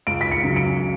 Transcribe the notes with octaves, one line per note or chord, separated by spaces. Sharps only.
C#2 D7
B6
C#7
C#3 F#3
D7